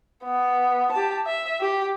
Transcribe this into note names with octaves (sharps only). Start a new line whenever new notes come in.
B3
G4 A5
E5
G4